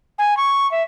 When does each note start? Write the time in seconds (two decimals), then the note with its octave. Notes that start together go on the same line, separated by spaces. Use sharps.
0.18 G#5
0.37 C#6
0.71 E5